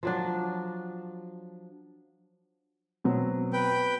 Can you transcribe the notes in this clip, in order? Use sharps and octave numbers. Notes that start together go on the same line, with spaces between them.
F3 F#3 D4
B2 F#3 C4
B4 G5